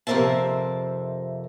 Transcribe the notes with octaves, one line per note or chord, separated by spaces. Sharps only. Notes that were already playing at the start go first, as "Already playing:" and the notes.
F2 C3 A#4 C5 E5 A5